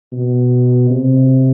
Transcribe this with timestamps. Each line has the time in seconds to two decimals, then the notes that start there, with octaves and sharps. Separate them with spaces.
0.13 B2
0.90 C3